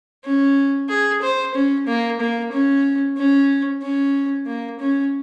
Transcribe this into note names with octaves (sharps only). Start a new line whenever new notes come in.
C#4
G#4
C5
C#4
A#3
A#3
C#4
C#4
C#4
A#3
C#4